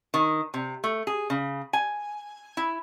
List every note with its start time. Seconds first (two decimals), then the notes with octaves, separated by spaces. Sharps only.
0.14 D#3
0.54 C3
0.84 A3
1.07 G#4
1.30 C#3
1.73 G#5
2.57 E4